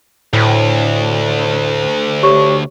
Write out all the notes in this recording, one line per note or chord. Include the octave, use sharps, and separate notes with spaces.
D2 A2
G4 C#5 C#6